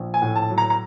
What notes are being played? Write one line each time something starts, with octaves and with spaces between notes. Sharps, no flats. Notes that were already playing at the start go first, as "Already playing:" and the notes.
Already playing: A#1
G#5
A2
A5
F#3
A#5
A#5